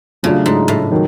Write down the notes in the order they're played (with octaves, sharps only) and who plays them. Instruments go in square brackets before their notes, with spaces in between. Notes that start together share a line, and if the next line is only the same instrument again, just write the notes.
[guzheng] C#3 [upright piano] F#3 A3 D4 F4
[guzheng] G#2
A2
[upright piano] D#3 F#3